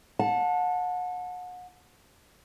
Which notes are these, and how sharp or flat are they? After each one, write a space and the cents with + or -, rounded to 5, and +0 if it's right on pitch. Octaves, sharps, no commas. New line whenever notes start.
F#5 -35 A5 +0